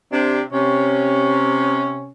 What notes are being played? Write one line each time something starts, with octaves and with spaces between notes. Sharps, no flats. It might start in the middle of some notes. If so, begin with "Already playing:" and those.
C3 D4
C3 C#4